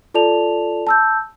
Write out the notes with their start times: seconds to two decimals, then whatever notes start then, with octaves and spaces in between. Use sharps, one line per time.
0.14 F4 A4 D5 A5 F7
0.87 A5 E6 G6